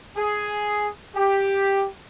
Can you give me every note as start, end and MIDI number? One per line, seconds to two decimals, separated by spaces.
0.17 0.88 68
1.16 1.86 67